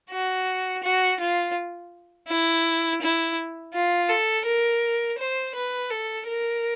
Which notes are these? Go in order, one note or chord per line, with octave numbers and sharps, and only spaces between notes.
F#4
F#4
F4
E4
E4
F4
A4
A#4
C5
B4
A4
A#4